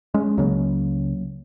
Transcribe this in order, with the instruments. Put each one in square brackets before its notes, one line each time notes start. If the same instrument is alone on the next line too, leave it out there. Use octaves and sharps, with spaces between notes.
[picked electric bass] G#3 C#4
C#2 C#3 F#3 A#3